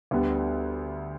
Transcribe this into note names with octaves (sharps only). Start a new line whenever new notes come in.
D2 D3 G3 B3